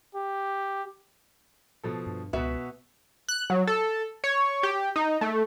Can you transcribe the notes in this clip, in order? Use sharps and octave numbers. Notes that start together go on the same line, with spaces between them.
G4
B2 F3 A4
G2
C#2 B2 B3 F#4 E5
F#6
F#3
A4
C#5
G4
D#4
A3